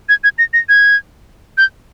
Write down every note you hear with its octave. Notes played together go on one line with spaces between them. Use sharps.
G#6
G#6
A#6
A#6
G#6
G6